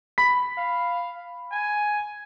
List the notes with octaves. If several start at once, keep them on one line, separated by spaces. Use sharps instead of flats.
B5 B6
F5
G#5